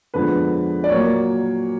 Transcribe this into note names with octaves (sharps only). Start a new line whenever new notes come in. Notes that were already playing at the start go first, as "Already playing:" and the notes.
F2 D3 F3 G#3 B3 B4
D5
A#2 F#3 A#3 C#5